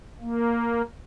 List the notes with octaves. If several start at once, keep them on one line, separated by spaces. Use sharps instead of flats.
A#3